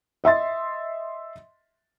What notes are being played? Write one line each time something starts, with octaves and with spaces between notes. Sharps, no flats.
D#5 E5 C6 A6